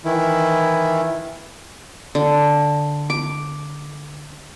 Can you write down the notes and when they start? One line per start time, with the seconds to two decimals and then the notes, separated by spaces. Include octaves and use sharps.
0.05 D#3 E3 E4
2.15 D3
3.10 D6